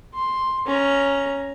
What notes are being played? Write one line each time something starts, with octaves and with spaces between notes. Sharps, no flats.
C6
C#4 A#5